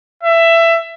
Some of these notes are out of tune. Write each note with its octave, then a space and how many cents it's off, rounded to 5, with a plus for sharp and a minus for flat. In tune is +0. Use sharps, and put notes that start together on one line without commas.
E5 +15